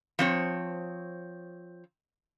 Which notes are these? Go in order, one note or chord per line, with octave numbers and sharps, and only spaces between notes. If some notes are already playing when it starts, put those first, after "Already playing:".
F3 C4 C#5